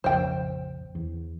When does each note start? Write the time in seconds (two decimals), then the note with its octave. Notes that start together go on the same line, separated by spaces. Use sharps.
0.04 A#1 F2 C#3 C5 G5
0.95 E2